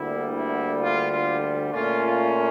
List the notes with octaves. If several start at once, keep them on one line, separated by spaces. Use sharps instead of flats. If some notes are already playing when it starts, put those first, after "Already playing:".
Already playing: D2 D3 G3 A#3 E4
E4
F4
F4
A#2 A3 C#4 F4
F4